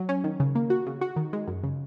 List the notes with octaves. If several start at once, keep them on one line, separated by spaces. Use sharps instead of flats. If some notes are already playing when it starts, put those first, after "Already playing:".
Already playing: F#3
C#4
D#3
C#3
A#3
F#4
C#3
F#4
D#3
G#3
F#2
C#3